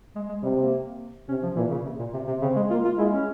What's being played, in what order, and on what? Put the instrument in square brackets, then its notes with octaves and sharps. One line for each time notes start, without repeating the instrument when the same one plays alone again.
[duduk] G#3
G#3
[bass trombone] C3 [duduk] G3
[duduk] A#3
[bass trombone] C3 [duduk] C#4
[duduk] F3
[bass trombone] A#2 [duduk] E3
[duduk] C#3
C3
A#2
C3
C3
[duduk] C#3 [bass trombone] C4
[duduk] G#3
[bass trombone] A#3 [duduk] F4
[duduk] F4
[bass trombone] G#3 [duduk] E4
[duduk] C#4